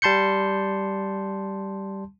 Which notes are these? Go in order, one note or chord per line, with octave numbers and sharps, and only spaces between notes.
G3 A5 C6 G6 C#7